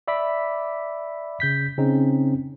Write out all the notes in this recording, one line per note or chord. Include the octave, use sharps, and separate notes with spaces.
D5 E5 B5 D6 B6
C#3 G6 B6
C#3 C4 C#4 D#4 G#4